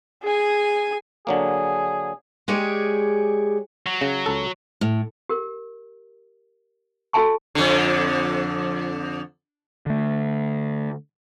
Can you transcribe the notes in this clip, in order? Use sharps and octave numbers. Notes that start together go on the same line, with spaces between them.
G#4 G#5
D3 F#3 A#3 G#4
G#3 G4 G#4 C#5 D5
F#3
C#3
C#2 A4
A2
G4 A#4
F#4 A4 E5 G#5 A5 C#6
F2 D3
D3 A3